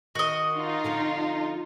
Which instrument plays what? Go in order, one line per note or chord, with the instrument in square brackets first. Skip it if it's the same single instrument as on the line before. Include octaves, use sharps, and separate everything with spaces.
[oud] D#3 [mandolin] F#4 D#5
[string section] D#4 F4
[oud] D3 F3 C4